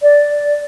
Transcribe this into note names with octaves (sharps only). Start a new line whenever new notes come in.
D5